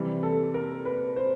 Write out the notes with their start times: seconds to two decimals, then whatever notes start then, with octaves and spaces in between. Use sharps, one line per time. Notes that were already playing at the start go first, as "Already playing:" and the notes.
Already playing: C3 E3 G3
0.23 A4
0.54 A#4
0.85 B4
1.16 C5